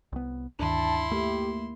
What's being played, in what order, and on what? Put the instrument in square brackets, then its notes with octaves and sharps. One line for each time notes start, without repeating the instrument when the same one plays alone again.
[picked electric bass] C2 B3
[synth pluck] D2 G2 D#3 [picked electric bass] D4 [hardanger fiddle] E4 C6 [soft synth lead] A5
[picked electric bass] A3 [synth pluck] A#3 [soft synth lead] G4